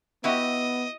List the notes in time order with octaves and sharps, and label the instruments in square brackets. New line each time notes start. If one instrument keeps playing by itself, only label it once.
[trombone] B3 [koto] E4 F#4 G4 [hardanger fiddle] D#5